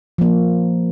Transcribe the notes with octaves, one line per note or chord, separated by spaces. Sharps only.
F3 A#3